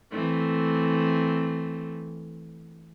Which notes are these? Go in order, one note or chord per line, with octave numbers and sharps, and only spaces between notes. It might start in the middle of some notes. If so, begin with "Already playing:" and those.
E3 A3 C4